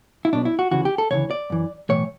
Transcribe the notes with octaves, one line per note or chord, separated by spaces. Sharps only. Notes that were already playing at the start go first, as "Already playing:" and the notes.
E4
B1 B2 D4
E4
F#4
D2 C#3 E3 F#4
G4
A4
D2 C#3 E3 C#5
D5
F#2 E3
B1 A2 E3 C#5